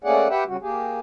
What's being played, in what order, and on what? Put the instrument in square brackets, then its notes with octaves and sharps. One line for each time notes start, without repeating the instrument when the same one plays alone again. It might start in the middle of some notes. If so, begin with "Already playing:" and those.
[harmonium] A3 A#3 C#4 G#4 D5 F#5
G4 B4 E5 F#5 G5
C#3 G3 F#4
A#3 G4 G#4